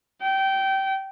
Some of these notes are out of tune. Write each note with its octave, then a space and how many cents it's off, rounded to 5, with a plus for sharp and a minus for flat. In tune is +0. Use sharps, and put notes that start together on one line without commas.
G5 -20